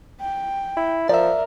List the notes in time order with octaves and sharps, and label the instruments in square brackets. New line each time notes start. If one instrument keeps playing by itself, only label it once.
[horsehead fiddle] G5
[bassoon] E4
[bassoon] F3 [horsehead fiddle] A#4 [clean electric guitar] D5 E5